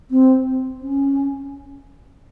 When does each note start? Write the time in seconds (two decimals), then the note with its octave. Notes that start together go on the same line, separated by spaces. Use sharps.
0.11 C4
0.82 C#4